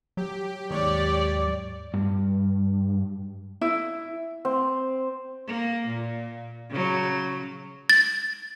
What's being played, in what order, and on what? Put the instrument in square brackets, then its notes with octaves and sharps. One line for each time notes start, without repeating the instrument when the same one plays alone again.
[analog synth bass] F#3 [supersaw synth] G4
[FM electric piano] D#2 G#2 [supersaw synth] G4 C#5 [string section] D5
[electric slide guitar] G2
[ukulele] E4
[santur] C4
[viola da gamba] A#3
A#2
C#3 F#3
[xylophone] A6